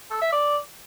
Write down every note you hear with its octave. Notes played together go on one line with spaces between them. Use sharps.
A4
E5
D5